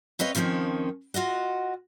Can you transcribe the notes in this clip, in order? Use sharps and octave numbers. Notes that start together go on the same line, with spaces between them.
C4 B4 C#5 D#5 F5
F2 D#3 F3 C4 C#4
F4 F#4 D#5 F#5